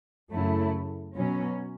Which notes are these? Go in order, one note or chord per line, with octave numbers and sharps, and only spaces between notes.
F#2 C#3 F#3 A3 E4
B2 F#3 C#4